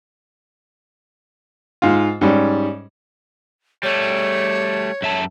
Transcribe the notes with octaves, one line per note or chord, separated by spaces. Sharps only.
G#2 F4
G#2 G3 C#4
G3 A3 C#5
F#2 E5 A5